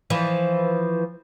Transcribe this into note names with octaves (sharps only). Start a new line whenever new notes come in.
E3 F3